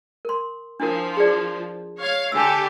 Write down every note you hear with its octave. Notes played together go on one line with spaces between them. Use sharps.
A#4 C6
F3 D4 E4 A#4
G#4 D5
C#5 F5
D3 G4 A4 G#5 E6